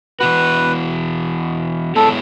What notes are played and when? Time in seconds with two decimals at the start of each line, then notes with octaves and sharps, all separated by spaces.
0.20 E3 B3 F#4 B4
1.96 G#3 B3 E4 G#4 A4 C#5